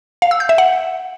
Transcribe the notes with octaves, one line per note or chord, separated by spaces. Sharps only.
F5
E6
G6
E5
F#5